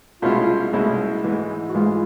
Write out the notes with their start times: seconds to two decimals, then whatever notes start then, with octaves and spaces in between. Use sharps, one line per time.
0.22 C2 B2 G#3 C#4 E4 F4
0.73 C2 B2 G#3 C#4 E4
1.24 G#2 E3 G#3
1.69 F#4
1.74 G#2 E3 G#3 F4